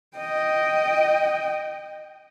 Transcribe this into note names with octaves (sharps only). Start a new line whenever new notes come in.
D#5 G5